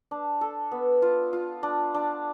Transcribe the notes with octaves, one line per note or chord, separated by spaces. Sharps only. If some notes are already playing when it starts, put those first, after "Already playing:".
D4
A4
B3
F4
F4
D4
D4